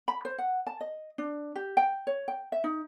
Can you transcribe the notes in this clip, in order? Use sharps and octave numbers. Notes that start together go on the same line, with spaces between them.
B5
C5
F#5
A5
D#5
D4
G4
G5
C#5
G5
E5
D#4